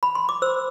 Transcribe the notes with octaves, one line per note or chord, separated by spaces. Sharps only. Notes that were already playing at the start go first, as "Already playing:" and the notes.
B5
C6
D6
C5 E6